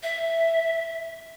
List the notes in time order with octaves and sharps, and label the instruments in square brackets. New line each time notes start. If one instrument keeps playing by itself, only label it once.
[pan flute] E5